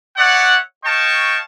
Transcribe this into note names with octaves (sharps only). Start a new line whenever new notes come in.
C#5 D5 E5 F#5
C#5 D#5 F5 G5 A5 C#6